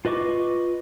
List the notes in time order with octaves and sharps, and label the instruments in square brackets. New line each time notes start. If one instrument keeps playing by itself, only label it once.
[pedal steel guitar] F4 B4 D#5 C#6 D6